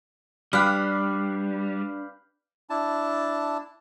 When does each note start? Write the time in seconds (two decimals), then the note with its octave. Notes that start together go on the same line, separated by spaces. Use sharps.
0.53 G3 D4 G4 B4 F5 F6 F#6
2.70 D4 E4 A5